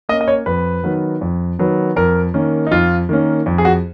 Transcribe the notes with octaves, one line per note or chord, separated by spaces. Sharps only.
A#3 C#4 D#5
D#5
C#5
F2 B4
D#3 F#3 B3
F2
D#3 F#3 B3
F2 A#4
D#3 A#3 C#4
D#4
F2 F4
D#3 A#3 C#4
F2
G#4
F#4